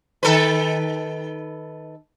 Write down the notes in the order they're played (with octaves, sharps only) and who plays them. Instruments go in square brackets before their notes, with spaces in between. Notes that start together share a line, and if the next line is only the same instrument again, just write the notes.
[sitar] D#3 A4 B4